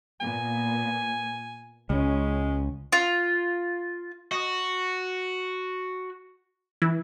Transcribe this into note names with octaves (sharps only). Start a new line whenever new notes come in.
A#2 A#3 B3 G#5
C#2 G#3 C#4
F4
F#4 D#5
E3 E4